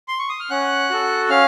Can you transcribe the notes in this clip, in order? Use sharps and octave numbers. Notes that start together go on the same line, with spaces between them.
C6
C#6
D#6
F6
C#4 F#5 F#6
F#4 A4
C#4 F5 F6